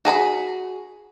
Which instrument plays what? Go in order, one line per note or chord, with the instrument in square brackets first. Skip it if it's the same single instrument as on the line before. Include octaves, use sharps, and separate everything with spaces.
[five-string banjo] F#4 G#4 A#5 B5